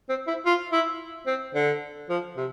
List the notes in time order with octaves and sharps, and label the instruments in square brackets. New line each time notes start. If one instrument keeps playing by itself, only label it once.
[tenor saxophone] C4
E4
F4
E4
C4
D3
F3
C3